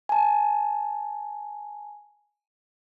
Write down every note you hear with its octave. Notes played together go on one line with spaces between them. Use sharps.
G#5 A5